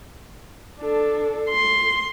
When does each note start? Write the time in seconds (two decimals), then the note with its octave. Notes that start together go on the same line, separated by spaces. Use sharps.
0.79 D4 A4
1.49 C6